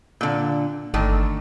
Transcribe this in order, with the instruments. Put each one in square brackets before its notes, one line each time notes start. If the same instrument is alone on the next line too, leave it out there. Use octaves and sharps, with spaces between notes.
[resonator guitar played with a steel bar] A#2 D3
[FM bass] G1 [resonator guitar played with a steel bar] D3 D#3 A3